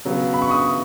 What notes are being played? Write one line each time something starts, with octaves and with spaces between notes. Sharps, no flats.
C#3 F#3 B3
B5
C#6
D#6